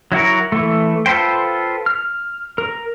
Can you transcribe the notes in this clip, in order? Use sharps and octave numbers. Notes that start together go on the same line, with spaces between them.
F#3 E4 F#4 A#4
E3 A3
F4 A4 B4 C5 G5
F6
A#4